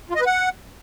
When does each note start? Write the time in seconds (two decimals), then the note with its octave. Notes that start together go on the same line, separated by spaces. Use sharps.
0.10 F4
0.15 D#5
0.21 B4
0.26 F#5